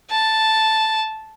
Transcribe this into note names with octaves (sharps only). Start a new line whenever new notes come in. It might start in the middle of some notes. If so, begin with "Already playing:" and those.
A5